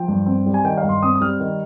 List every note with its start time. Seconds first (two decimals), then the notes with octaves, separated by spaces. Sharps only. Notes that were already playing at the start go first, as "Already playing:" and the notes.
Already playing: F3 G5
0.08 G2
0.26 C4
0.46 G3
0.54 G#5
0.64 D#3 G5
0.77 F5
0.83 G2
0.89 C6
1.03 C4 D#6
1.15 D#6
1.21 G3 F6
1.40 D#3